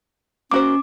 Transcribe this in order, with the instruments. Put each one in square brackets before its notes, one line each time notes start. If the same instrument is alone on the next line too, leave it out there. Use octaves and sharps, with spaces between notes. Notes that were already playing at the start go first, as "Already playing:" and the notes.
[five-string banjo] A#3 F#4 C5 [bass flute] C#4 [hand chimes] D6